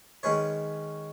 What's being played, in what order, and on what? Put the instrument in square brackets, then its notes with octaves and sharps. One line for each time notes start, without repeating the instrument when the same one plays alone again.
[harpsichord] D#3 G#3 C#4 B4 C#5